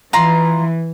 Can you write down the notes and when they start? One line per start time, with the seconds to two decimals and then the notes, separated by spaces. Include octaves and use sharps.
0.13 E3 F4 A#5 C6